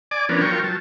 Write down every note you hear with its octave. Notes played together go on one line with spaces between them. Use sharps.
D5 G#5 D6
F3 B3 C#4 D4 A#4
F#3 F4 A#4 G5 C#6
F#3 A5